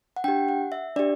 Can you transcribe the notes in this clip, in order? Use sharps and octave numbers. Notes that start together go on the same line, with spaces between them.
F#5
D4 G4 G5
F#5
E5
D4 G4 D5